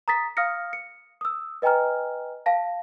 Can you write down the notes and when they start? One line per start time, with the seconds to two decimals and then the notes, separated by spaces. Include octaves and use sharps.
0.08 A#5 D#6 A6 B6
0.37 F5 D#6 F6 A#6 C#7
0.73 C#7
1.21 D#6 E6
1.62 B4 D#5 G5 G#5 A#5 F6
2.46 F5 A5 A#6